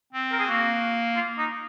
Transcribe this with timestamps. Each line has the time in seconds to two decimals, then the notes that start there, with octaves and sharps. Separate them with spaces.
0.13 C4
0.32 A#4
0.39 G#4
0.47 A#3 F#4
1.16 F4
1.38 D#4